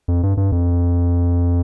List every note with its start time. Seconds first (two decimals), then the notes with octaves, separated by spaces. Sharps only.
0.08 F2
0.23 G2
0.37 G2
0.52 F2